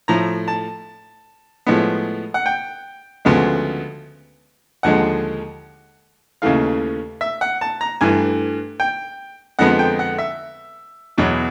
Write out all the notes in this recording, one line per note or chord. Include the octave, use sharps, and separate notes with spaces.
A2 F3 A3 A#5
A5
A2 F3 G#3 B3
F#5
G5
D2 C#3 F3 G#3 B3
D#2 D3 F3 G#3 F#5
D#2 C#3 E3 A3 F5
E5
F#5
A5
A#5
G2 E3 A3 G#5
G5
F2 D3 F3 G#3 B3 F#5
G5
F#5
E5
E2 B2 F#3